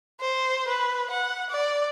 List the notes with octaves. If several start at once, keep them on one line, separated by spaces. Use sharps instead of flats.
C5
B4
F#5
D5